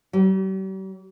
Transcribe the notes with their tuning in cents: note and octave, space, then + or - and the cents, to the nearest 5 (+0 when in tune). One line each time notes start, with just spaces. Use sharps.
G3 -45